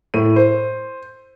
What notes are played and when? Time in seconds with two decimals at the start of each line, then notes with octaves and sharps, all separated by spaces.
0.14 A2 E4 D#7
0.36 C5